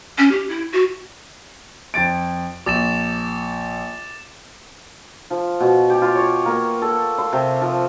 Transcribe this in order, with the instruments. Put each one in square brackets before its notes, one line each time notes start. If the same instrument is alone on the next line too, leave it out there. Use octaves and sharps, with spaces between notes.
[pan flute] C#4
G4
E4
F#4
[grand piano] F2 A6 D7
[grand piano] A#1 [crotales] D6 A6 E7
[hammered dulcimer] F3
B2
G4
F4
C#5
A#3
A4
C6
C3
F3